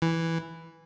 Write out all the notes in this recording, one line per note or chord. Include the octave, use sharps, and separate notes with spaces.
E3